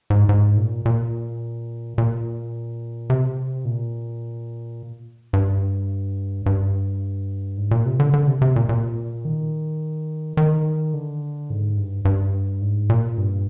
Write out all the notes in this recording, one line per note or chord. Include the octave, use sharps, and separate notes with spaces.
G#2
G#2
A#2
A#2
A#2
C3
A#2
G2
G2
G#2
A#2
C3
D3
D3
C3
C3
A#2
A#2
D#3
D#3
D3
G#2
G2
G2
G#2
A#2
G2